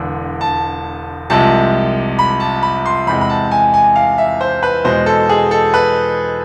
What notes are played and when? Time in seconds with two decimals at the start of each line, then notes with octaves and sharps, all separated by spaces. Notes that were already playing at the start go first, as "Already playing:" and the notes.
Already playing: E1 E2 D3
0.41 A5
1.30 C2 C3 F3 G#3 A5
2.19 B5
2.40 A5
2.63 B5
2.86 C6
3.07 E2 C3 G#3 B5
3.21 B5
3.30 A5
3.51 G#5
3.74 G#5
3.96 F5
4.18 E5
4.41 C5
4.63 B4
4.84 E2 B2 G#3 C5
5.06 A4
5.29 G#4
5.51 A4
5.74 B4